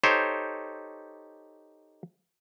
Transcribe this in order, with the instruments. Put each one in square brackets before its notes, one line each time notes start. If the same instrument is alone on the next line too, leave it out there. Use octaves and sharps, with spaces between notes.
[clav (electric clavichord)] D#4 G4 A4 C5 C#5